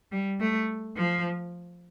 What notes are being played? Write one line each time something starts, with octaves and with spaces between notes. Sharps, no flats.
G3
A3
F3